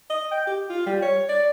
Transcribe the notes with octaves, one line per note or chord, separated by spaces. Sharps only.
D#5
G5
G4
F4
G3
C#5
D5